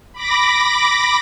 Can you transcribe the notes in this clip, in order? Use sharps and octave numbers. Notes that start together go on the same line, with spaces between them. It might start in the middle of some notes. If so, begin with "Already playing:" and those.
B5 D6 A#6